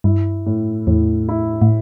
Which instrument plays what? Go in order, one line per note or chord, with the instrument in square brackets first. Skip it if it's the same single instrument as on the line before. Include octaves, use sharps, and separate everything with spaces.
[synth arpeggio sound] G2 [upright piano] E4
[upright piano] A2
[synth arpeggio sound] E2 [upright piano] A2
[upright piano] E4
[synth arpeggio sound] A2